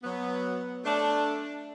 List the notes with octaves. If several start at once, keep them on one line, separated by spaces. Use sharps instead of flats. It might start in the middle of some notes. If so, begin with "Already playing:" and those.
F#3 B3
A3 D4